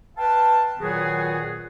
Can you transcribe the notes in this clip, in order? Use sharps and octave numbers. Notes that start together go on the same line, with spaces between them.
B4 F5 G5 A5
A#2 D#3 F#3 B3 F#4 G#4